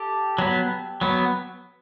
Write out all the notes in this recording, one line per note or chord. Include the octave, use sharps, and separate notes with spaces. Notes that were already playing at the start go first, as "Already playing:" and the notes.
Already playing: G4 A4
F#3 B3
F#3 B3